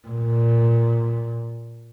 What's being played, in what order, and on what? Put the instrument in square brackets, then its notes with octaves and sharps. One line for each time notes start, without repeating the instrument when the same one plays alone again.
[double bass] A#2